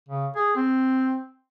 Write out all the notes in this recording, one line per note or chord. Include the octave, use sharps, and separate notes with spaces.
C#3
G#4
C4